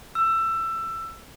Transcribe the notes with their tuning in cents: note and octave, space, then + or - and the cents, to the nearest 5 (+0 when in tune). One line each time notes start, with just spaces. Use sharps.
E6 +20